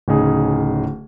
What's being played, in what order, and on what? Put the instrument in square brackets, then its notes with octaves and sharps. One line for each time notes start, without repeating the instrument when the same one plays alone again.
[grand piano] D1 C#3 D#4 G#4